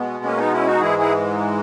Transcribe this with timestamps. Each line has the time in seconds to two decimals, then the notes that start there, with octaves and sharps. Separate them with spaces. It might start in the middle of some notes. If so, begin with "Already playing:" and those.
Already playing: B2 G#3 B3
0.24 A#3 C#4
0.38 B3 D#4
0.52 C#4 E4
0.66 D#4 F#4
0.80 G#2 E3 G#3 E4 G#4
0.99 E4 G#4